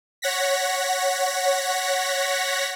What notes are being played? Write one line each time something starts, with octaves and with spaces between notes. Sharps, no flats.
C#5 F#5 A#6 B6